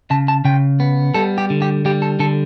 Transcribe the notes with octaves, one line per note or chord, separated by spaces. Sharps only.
C#3 A5
A5
C#3 G5
B3
G3 A4
G4
D3
G4
G3 G4
A4
D3 A4